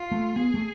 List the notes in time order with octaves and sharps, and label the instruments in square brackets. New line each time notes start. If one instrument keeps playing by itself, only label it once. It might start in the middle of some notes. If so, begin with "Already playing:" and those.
Already playing: [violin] F4
[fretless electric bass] A3
[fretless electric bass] B3 [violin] G#4
[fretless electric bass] A3